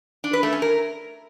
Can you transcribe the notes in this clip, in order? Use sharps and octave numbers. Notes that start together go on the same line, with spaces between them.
D4
B4
A3
C#4
A#4